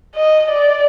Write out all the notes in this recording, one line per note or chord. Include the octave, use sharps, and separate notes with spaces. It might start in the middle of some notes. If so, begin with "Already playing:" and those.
D#5
D5